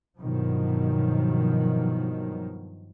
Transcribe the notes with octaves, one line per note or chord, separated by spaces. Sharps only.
G2 B2 D#3 F3 F#3